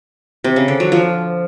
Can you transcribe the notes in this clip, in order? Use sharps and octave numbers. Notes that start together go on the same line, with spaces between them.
C3
C#3
D3
F#3
F3